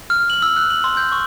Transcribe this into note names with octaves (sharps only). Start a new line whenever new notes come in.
F6
F#7
E6
F#6
F#7
C6
G6
C#6